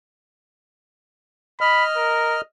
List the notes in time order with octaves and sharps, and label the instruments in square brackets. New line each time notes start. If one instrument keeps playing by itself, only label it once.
[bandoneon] D#5 F6 [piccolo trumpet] B5
[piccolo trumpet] A#4